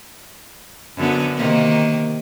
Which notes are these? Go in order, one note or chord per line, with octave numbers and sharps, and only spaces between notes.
F#2 D3 B3
C3 D#3 A#3